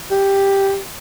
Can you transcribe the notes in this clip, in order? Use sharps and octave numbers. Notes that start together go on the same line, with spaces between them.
G4